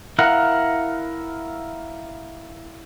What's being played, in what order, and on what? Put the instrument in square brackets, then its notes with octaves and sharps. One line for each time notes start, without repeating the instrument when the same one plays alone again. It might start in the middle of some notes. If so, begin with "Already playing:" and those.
[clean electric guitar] E4 A#4 F5 F#5